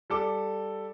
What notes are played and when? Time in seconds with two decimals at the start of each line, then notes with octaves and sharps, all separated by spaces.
0.10 G3 A4 D6